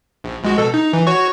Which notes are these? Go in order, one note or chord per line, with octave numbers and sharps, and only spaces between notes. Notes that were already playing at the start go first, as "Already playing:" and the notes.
A#1
A#1 G#3 F#4
B2 A4
D#4
E3
F#4 C#5 C#6